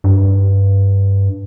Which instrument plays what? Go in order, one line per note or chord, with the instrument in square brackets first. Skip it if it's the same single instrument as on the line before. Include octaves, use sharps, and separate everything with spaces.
[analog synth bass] G2